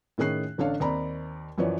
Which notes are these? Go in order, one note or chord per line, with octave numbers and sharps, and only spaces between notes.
A2 D#3 C#4 G#4 F#6 C7
A1 D3 D4 A4 C#5 F5
D#2 C4 D5 A#5 B5
F#2 E3 F3 B4 C#5 D5